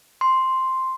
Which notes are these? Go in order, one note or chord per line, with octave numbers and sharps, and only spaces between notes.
C6